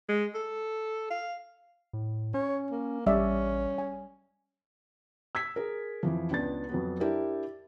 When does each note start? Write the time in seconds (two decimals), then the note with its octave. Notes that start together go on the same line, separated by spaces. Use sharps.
0.09 G#3
0.35 A4
1.10 F5
1.93 A2
2.34 C#4 C#5
2.71 A#3
3.06 A1 G3 C#4 D5 E5
3.78 G#5
5.35 E6 G#6 B6
5.56 G#4 A#4
6.03 F2 E3 F3
6.31 C#2 B3 D4 A6
6.69 F2 F#3 B3
7.00 D4 E4 G4 A#4